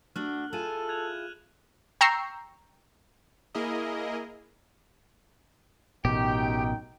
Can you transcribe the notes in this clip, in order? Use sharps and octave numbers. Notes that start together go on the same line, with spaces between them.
A3 D4 F#4 F6 F#6 F#7
E4 F4 G#4 A4 D#7 E7 F#7
F#6 G#6 F7
G5 A#5 C#6 E6 G6 C7
A#3 E4 G#4 A#4 D#5
A1 F#2 B2 D#4 G4 G5